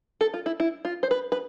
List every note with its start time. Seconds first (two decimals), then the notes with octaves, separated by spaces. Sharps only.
0.21 A4
0.34 F4
0.46 E4
0.60 E4
0.85 F4
1.03 C5
1.11 B4
1.32 B4